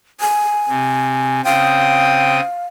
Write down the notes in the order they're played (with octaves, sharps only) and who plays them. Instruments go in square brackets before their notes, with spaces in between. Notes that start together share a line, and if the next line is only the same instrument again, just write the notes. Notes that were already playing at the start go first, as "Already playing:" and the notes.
[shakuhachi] G#5
[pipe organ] C3
[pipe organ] C#3 C4 D#6 [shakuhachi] F5 [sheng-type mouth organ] G5